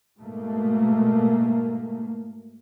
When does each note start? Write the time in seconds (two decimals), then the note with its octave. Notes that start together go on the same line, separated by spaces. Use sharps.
0.18 G#2 B2 A3 A#3